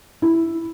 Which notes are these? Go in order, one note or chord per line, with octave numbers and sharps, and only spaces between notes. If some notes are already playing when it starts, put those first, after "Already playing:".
E4